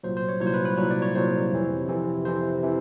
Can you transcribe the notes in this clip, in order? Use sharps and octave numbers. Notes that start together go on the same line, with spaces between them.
C2 A#2 F#3 C5
C5
C#5
C2 A#2 F#3 C#5
C5
B4
B4
C2 A#2 F#3 C#5
D5
C#5
C2 A#2 F#3 C5
F2 C3 E3
F2 C3 E3
F2 C3 E3 C5
C3 E3